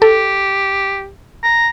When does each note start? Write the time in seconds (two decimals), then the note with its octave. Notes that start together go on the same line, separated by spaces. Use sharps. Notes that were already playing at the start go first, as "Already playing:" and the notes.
0.02 G4 A4
1.44 A#5